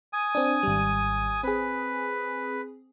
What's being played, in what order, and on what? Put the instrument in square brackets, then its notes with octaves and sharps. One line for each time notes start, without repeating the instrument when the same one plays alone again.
[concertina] G#5 D#6
[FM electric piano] C4 D4
G#1 G3
[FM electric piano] C4 G#4 [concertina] B4